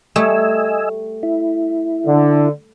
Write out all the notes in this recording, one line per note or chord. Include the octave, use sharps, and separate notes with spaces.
G3 A3 D#5 G#5 E6
E4
D3